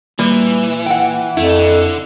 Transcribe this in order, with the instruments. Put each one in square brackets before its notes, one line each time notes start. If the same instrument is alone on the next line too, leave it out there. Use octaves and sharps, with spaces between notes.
[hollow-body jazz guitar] A#2 [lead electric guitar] E3 [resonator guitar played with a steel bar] G3
[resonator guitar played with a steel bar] F#5 G5
[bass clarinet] F2 [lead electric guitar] A3 [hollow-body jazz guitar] E4
[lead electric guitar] D3